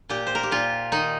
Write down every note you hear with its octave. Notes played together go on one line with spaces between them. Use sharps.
A#2 G4
C5
A#4
G4
A#2 F4
D#3 D#4